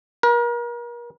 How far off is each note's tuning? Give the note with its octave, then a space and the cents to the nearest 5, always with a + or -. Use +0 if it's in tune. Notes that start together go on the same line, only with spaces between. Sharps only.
A#4 +40